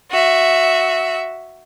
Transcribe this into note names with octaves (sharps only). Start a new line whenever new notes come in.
F#4 E5